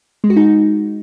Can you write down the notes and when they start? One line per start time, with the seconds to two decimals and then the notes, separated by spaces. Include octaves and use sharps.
0.24 G#3
0.30 F#4
0.36 D#4